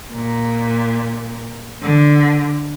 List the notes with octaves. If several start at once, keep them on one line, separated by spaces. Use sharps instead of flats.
A#2
D3